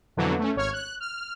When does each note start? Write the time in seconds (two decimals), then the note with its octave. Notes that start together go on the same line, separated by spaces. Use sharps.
0.17 F2 B2 D3 E3 F#3
0.39 A3 C#4
0.56 G#1 C#5 F6 G#6
0.73 F#6
1.00 F6